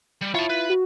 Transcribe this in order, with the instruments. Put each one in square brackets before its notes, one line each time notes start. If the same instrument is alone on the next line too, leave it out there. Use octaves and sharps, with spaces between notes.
[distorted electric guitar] G3
[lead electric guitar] E4 F4 [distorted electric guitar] C#5 A5
[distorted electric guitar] B4
[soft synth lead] F#4